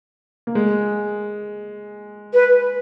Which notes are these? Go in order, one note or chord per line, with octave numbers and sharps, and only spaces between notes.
A#3
G#3
B4